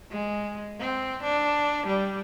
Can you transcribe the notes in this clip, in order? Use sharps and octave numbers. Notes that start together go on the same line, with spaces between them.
G#3
C4
D4
G3